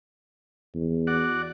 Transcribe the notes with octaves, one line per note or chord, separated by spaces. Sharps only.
E2
F#4 D5 F#5